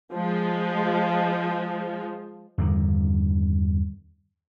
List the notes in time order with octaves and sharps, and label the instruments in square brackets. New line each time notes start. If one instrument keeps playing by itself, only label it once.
[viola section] F3 G#3
[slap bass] E2 G2 D3 D#3